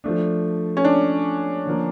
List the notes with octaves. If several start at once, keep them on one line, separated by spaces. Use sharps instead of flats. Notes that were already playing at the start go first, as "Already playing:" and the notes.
F3 A3 D4
C#4
D4
D3 F3 A#3